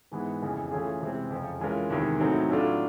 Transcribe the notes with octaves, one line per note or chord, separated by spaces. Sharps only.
G#2 E3 G#3 B3
F2 C#3 E3
E3 A3 C#4 F4 G#4
C3 E3 G#3 C4
F2 C#3 F3
E3 G#3 C#4 F4 A#4
E2 C3 D#3 G#3
A2 F#3 A3 C4 D#4
A2 F#3 A3 D4 F4